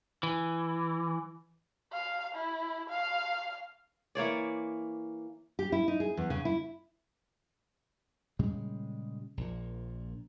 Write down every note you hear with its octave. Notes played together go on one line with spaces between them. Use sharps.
E3
F5
E4
F5
E3 A#3 C#5 D5
G4
E4
D#4
G#4
E2
C#3
E4
A#2 C#3 G3 G#3
A#1 A#2